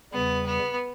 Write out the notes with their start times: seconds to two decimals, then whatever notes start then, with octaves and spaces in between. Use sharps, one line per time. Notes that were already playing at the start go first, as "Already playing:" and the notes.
0.13 E2 C#3 G3 B3
0.46 B3